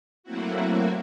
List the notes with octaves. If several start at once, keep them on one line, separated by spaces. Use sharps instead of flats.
F#3 A3 A#3 C4 E4 F#4